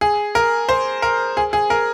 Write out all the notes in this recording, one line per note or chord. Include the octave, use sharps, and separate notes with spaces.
G#4
A#4
C5
A#4
G#4
G#4
A#4